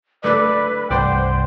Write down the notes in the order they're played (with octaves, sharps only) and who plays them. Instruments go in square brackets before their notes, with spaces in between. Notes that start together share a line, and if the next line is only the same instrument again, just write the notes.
[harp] A3 D4 A4 [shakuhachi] B4 [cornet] D5
[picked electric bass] C2 G2 [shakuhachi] C5 [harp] D5 F#5 [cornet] G5